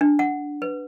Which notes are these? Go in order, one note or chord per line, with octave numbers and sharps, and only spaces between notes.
D4
F#5
B4